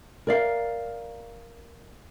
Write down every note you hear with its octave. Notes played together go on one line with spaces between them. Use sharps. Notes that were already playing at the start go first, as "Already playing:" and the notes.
A#4 D5 F5